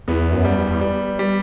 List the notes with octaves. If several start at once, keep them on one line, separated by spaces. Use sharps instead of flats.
E2 B3
F#2
G3
E2
G3
G3